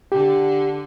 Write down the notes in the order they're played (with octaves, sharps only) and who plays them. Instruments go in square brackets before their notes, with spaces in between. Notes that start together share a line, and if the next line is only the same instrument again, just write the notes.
[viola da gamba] D3 [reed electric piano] G4